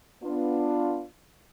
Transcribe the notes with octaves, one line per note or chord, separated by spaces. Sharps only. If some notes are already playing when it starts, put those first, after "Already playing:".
B3 D4 F4